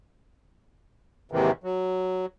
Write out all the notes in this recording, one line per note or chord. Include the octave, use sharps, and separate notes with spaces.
D#2 G#2 C3 D#3 E3
F#3